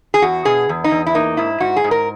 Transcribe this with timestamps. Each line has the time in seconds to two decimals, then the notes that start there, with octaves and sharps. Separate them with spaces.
0.14 G#4
0.22 E2 F#4
0.45 B2 G#4
0.69 E2
0.84 D#4
0.91 E2
1.06 E4
1.15 A#3 D#4
1.37 G#2 E4
1.60 G#2 F#4
1.76 G#4
1.84 G#2
1.91 A#4